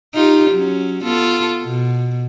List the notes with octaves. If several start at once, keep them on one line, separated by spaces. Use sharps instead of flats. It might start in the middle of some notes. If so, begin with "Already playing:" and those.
D#4 F4 G4
F#3 C#4
B3 F4 A4
B2